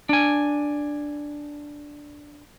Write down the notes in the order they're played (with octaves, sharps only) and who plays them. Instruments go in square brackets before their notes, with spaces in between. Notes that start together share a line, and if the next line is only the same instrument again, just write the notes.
[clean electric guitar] D4 G#5